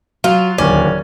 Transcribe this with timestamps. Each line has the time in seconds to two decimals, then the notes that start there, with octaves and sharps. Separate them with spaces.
0.24 F#3 F4
0.58 D1 D#2 C#4 D5